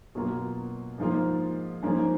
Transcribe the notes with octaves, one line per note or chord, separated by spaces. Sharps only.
B2 F#3 A#3 F4
G#2 F3 A#3 F4
G#2 F3 A#3 C#4